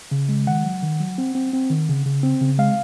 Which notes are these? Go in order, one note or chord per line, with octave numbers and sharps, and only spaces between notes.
C#3
G#3
D#3 F#5
F#3
D#3
F#3
C4
C4
C4
D#3
C#3
C#3
C4
C#3
G#3 F5